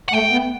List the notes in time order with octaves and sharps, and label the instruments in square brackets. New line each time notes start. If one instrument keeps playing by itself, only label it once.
[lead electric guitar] F#5
[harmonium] A3 [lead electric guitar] G5
[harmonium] B3